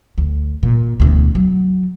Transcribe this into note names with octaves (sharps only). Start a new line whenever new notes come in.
D2
A#2
E1 D2
F#3